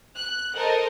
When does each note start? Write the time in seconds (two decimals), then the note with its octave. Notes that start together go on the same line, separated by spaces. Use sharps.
0.16 F#6
0.55 A4 A#4 C5 D#5